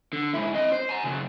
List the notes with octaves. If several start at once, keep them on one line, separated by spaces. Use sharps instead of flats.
D3
G#2 E4
C4 D#5
C5
G#5 A#5
C#3 F#3